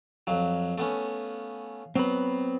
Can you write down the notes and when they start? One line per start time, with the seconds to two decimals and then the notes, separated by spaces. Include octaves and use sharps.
0.27 F2 F#3 F5
0.78 A3 B3 C#4
1.96 F#3 B3 C4 B4